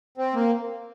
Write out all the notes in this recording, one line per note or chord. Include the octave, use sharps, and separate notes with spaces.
C4
A#3